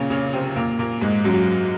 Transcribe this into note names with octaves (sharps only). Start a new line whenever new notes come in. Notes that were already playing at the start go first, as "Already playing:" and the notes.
Already playing: A#2 C#3 A#3 C#4
C#3 C#4
C3 C4
A#2 A#3
A#2 A#3
G#2 G#3
F#2 F#3